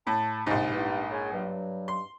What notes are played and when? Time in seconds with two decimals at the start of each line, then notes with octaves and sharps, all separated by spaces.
0.07 A2 A5
0.46 A#1 G#2 C3
0.73 G2 B3 E4
1.11 G#4 C#5 G#5
1.32 G2 F#3
1.88 C6